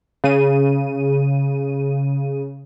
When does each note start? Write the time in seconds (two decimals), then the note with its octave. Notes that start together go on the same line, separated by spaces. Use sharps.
0.24 C#3 D#7